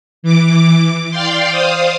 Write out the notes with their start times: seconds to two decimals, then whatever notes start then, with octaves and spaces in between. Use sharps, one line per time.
0.23 E3 D6
1.11 D5 F5 G5 C6
1.49 C5 F5 D#6